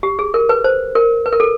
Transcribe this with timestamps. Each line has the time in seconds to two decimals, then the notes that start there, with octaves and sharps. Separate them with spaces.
0.03 G4
0.19 G#4
0.34 A#4
0.49 B4
0.64 C5
0.95 A#4
1.26 B4
1.33 A#4
1.40 A4